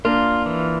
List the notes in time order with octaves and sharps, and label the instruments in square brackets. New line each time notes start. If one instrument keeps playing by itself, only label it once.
[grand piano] A#3 D4 [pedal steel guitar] F4
[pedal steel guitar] E3